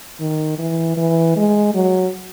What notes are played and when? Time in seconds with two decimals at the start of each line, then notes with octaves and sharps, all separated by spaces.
0.20 D#3
0.58 E3
0.97 E3
1.36 G#3
1.74 F#3